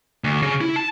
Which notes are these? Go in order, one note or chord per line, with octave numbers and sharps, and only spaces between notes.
D2
C#3
E4
A5